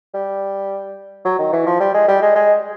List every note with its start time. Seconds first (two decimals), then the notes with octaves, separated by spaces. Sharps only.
0.14 G3
1.25 F#3
1.39 D#3
1.53 E3
1.67 F3
1.80 G3
1.94 G#3
2.08 G3
2.22 G#3
2.36 G#3